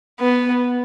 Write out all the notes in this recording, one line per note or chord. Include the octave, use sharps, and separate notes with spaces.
B3